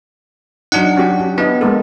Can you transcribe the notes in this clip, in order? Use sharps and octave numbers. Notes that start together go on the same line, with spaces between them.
F#3 D4 D#4 F#5
C#4 F#4 G4
B3 D4 E4 D#5
G#3 A#3 A4